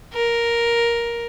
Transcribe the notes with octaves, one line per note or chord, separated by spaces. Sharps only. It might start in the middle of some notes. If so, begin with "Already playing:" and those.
A#4